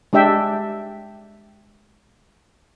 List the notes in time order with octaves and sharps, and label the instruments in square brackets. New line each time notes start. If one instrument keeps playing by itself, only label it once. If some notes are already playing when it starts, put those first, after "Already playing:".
[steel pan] G#3 D4 G4 E5 G5